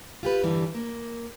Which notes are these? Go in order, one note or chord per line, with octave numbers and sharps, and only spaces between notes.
F4 G4 B4
E2 G2 D3 E3 G3
A#3